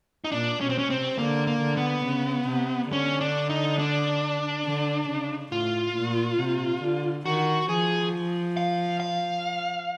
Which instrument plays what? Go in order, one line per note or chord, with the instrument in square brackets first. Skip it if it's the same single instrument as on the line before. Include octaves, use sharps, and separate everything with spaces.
[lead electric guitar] D#4
[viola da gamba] A#2 [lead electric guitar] D4
[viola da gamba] B2 [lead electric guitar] C#4
[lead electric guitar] C4
C#4
[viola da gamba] C3 [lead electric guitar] C4
[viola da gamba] D3 [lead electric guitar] A#3
[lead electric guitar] A#3
[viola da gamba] D3
[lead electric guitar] B3
[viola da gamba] C#3
C3
[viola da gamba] D3 [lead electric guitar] C#4
[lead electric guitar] D4
D#4
D4
[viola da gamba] D3
C#3
[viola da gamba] A2 [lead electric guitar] F4
[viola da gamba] A#2
C3
D3
[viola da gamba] D#3 [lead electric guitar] F#4
[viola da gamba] F3 [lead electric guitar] G#4
[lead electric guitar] F5
F5